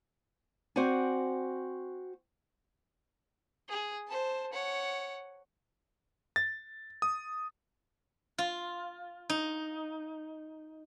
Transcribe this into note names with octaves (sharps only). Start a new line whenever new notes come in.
C4 F#4 C5 D5 F#5 G#5
G#4
C5 A5
C#5 F#5
A6
D#6
F4
D#4